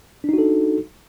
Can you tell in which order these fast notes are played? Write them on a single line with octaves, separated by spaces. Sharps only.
D4 D#4 F#4 A4